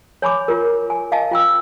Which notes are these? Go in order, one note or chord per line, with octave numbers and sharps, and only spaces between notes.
C#5 G#5 B5 D6
F4 A#4
G#5
D#5 F5 G#5 A5
F4 G5 E6